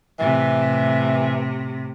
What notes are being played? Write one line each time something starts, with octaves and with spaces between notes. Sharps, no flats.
A2 C3 E3